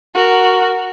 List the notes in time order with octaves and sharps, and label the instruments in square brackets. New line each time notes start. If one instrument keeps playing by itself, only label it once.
[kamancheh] F#4 A#4